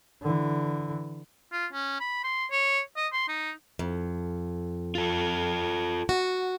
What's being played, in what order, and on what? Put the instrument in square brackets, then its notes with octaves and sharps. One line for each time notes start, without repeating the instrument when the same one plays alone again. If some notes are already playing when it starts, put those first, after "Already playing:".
[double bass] D3 E3
[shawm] F4
C#4
B5
C6
C#5
D#5
C6
D#4
[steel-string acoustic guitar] F2
[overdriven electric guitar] F4 A4
[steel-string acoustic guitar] F#4